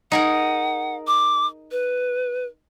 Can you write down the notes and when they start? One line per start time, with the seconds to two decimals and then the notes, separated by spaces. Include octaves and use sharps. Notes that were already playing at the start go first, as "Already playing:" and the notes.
0.12 D#4 G#4 A#4 F#5
1.07 D6
1.71 B4